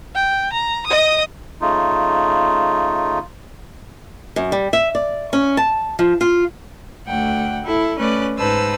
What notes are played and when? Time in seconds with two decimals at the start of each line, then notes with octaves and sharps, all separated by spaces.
0.15 G5
0.53 A#5
0.87 D#5 D#6
1.61 C#3 A3 D#4 F4
4.36 F#2
4.52 G3
4.73 E5
4.95 D5
5.33 C#4
5.57 A5
5.99 F3
6.21 F4
7.08 D2 A3 F#5 G5
7.64 E4 A4
7.98 A3 C#4 B4 D5 F#6
8.38 G#2 D#4 B4 C5 A5 E6